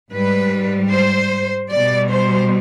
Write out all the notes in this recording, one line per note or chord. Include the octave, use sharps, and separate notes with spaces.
G#2 G3 B4
C5
B2 G3 D5
C5